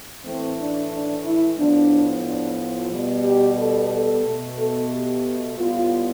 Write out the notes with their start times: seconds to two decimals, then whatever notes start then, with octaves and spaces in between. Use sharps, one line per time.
0.24 A2 E3 A3 C4
0.58 D4
0.91 D4
1.24 E4
1.58 A2 F3 B3 D4
2.24 D4
2.57 F4
2.91 B2 G3 B3
3.24 G4
3.57 A4
3.91 A4
4.24 B2 A3
4.58 A4
4.91 G4
5.57 A2 G3 B3 F4